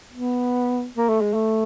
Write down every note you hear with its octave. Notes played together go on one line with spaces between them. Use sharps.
B3
A#3
A3
G#3
A3